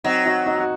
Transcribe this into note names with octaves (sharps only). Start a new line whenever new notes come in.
F#3 C4 D#4
D#4 F#4
D#4 F#4
F#4